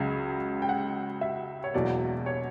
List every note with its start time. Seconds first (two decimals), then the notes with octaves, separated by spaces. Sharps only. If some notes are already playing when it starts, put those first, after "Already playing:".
Already playing: C#2 C#3 F#3
0.62 G5
0.69 F#5
1.21 E5
1.64 C#5
1.74 E1 E2 B2 F#3 A#3 D5
2.26 C#5